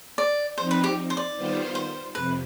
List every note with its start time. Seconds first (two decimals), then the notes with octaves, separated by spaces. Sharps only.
0.18 D5
0.57 F3 C4 D#4 C5
0.71 B4
0.84 G4
1.10 C5
1.17 D5
1.36 D#3 G3 B3 F4 C5
1.75 C5
2.15 F2 C3 B4